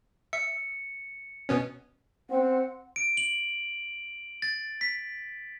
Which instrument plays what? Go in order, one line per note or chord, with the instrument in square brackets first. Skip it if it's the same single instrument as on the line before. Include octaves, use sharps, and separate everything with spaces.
[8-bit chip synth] E5 [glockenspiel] C#7
[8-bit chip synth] B2 B3 C#4
[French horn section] C4 [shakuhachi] F#5
[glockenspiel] D7
F#7
A6
B6